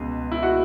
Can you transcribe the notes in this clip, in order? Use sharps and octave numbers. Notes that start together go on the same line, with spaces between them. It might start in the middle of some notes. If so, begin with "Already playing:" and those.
Already playing: C#2 B2
E4
F#4